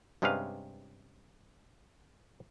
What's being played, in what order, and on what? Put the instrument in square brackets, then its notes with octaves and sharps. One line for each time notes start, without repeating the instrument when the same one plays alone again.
[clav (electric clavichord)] G2 C3 G#3 C#4 B4 F5